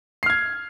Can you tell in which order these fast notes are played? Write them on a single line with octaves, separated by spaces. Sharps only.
C7 F6 G#6